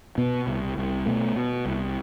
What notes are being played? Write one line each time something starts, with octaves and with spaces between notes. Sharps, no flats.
B2 B3
C2
C2
B2 A3
B2
C2